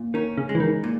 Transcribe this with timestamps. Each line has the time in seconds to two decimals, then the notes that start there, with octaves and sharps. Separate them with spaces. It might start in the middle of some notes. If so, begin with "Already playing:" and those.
Already playing: A#2
0.14 D#3 C#4
0.37 C#3
0.49 G#3
0.55 E3
0.60 D#3
0.84 A#2